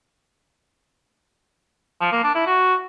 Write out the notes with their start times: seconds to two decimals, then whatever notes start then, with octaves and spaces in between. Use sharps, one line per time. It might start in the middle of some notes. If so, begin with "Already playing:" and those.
2.00 F3
2.12 A#3
2.23 D4
2.35 E4
2.46 F#4